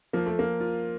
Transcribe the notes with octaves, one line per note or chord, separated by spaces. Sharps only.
F3 A#3
A3
A#3
F4